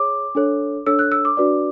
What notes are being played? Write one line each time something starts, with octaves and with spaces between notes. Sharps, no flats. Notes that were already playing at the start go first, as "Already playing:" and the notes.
Already playing: G#4 C#5 D6
D4 A4 C#5
D4 A4 C#5 E6
F#6
E6
D6
D4 F#4 B4 D5